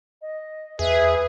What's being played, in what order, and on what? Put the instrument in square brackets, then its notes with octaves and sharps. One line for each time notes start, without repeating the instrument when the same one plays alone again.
[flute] D#5
[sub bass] E2 [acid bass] G#4 [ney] B4 [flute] E5